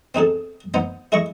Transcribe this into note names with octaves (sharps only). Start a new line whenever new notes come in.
C4 D#4 G#4 A4
B3 D#4 C5
E4 G#4 D#5 C#6